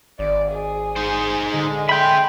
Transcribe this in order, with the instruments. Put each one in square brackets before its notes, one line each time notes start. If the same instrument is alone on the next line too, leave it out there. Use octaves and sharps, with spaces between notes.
[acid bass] G#1 [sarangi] D5
[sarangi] G#4
[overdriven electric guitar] D#4 C5
[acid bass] D3 [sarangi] G#3
[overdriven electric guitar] E5 C6 [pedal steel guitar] G5 B5